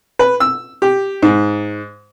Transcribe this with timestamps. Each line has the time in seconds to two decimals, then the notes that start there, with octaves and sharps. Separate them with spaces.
0.19 B4
0.40 E6
0.82 G4
1.22 G#2